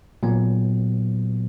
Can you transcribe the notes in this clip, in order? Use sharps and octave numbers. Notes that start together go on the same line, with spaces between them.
A#2 F#3 B3